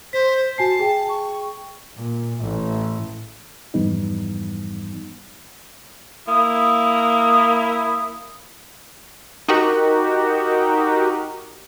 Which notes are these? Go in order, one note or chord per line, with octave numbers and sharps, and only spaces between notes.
C5 B6
F#4 G#5 A5 C7
G#4 G5
C#6
A#2
A1
F2 G#2 E3 G3 B3 D#4
A#3 E4 D#6
D#4 F#4 G4 A#4